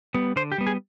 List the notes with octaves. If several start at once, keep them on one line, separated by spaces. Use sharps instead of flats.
G3 B3
D3 C5
G4
G3 B3
G#4